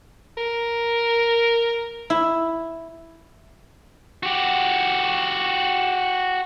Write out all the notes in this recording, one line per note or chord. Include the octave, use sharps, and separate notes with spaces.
A#4
E4
F#4 G4